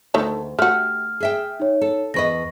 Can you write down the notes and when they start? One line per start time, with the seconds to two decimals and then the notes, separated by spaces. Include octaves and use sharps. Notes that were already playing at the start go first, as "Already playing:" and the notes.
0.14 D2 D#3 A3 A4
0.59 A3 F#4 G4 F6
1.20 G#4 E5 G5
1.60 D#4 C#5
1.81 A4
2.14 E2 B4 D#5 C#6 A#6